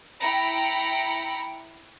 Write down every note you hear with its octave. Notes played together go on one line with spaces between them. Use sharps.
E4 G5 A#5 B5 C#7